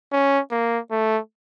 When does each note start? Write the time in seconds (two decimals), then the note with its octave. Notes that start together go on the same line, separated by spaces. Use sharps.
0.12 C#4
0.51 A#3
0.91 A3